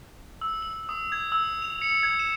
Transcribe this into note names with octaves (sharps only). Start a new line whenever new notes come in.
E6
F#7
D#6
G#6
E6
F7
C#7
G#6
E7